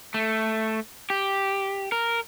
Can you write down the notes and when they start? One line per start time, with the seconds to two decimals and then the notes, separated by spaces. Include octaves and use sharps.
0.14 A3
1.10 G4
1.92 A#4